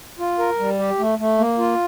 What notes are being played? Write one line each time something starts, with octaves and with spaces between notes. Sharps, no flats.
F4
A#4
G3
G4
A3
A3
A#3
F4